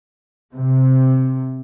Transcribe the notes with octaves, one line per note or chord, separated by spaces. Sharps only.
C3